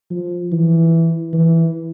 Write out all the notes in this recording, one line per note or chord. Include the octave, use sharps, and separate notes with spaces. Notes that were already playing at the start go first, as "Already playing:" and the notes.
F3
E3
E3